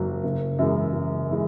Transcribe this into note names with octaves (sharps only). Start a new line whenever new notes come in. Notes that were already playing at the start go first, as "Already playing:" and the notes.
Already playing: F#1 F#3
F#1
F#2 E3 G#3
F#1
E3 G#3